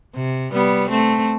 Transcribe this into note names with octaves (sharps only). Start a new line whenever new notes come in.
C3
G3 B3
A3 C4